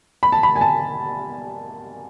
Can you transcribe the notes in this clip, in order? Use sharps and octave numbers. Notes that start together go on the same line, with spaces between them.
B5
A5
B5
G#5
A5